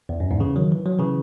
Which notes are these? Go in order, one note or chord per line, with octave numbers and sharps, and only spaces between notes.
E2
F#2
E2 G#2
C#3 E3
D#3 F#3
E3
F#3
C#3 E3